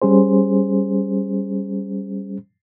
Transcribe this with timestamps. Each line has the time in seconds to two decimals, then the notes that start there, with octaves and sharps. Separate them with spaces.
0.02 G3 C#4 G#4 C5